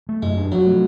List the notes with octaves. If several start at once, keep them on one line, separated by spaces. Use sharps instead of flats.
A3
F#2 G#3
D4
F3 F#3
A3